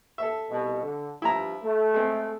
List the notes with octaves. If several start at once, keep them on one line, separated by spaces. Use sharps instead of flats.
A4 E5
C2 B2
D3
G2 F3 E4 A#5
A3
G#3 C4